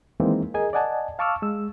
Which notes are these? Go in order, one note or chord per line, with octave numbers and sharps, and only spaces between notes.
D#3 E3 G#3 A#3 C4 D#4
G#4 A#4 D#5 G#5
D5 D#5 F#5 G#5 A5
F5 A5 C#6 D6 E6 F6
G#3 E6